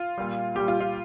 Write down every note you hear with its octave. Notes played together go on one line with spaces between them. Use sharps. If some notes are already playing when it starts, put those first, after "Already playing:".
Already playing: F4
A#2 G3
A#2 G3 G4
F4
F4